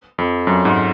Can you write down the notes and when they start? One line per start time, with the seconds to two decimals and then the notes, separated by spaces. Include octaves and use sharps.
0.18 F2
0.47 F#2
0.65 G#2